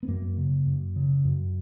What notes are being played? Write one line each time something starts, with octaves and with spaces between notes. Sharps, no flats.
B3
F#2 A#3
C#3
F#2
C#3
F#2